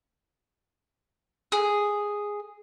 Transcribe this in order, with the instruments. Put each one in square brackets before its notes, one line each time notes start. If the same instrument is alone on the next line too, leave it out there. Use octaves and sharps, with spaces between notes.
[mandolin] G#4